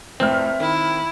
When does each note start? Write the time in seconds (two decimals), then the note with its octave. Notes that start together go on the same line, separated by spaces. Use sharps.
0.20 F1 A2 C4 E5 F6
0.60 D#3 E4